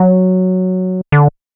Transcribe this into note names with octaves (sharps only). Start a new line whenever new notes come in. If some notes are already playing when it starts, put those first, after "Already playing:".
Already playing: F#3
D3